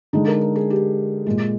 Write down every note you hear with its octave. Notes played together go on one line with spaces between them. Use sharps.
D3 G#3 D#4
A#4
A#4
G#4
G4
A#2 G#3